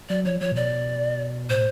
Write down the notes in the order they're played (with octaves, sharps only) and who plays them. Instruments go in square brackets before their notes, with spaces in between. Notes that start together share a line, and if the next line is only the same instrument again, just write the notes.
[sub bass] F#3 [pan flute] D5
[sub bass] F3 [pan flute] C#5
[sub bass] F3 [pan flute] C#5
[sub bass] A#2
[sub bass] B2 [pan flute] D5
[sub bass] A2 [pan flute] C5